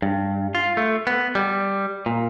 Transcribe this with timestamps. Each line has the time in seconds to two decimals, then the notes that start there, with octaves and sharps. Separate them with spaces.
0.02 G2
0.55 F4
0.77 A3
1.07 B3
1.35 G3
2.06 A#2